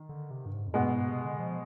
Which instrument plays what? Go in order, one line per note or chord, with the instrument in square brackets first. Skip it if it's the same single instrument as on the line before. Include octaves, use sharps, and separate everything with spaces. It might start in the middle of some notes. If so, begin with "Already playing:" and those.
Already playing: [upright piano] D#3
[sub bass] D3
C3
G2
G#2
F2
[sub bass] G2 [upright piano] B2 G#3 B3
[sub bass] G#2
C3
D3
F3